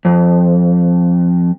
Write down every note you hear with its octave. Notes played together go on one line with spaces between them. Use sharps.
F2